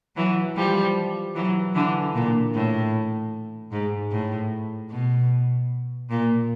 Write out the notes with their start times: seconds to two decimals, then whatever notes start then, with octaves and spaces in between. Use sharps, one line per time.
0.16 E3 F#3
0.56 F3 G3
1.35 E3 F#3
1.74 D3 E3
2.15 A#2
2.54 A2
3.72 G#2
4.12 A2
4.91 B2
6.10 A#2